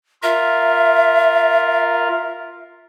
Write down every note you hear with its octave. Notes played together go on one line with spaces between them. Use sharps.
F4 A#4 E5